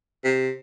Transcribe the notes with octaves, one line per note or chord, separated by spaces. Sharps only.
C3